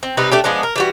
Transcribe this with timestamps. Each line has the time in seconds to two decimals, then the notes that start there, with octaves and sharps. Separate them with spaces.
0.03 C4
0.17 C3 G3 D#4 B4
0.31 A3 D4 G4
0.44 F3 G#3 B3 D4
0.63 A#4
0.76 E3 G3 F#4